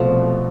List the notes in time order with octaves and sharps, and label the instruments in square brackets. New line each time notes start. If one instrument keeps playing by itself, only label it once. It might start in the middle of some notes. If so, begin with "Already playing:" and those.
Already playing: [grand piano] C2 B2 A3 [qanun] F3